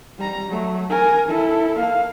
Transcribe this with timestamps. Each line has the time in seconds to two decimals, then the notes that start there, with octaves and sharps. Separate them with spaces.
0.18 G3 A#5
0.49 F#3 A3
0.90 A#4 G#5
1.28 E4 A4
1.79 A#3 F5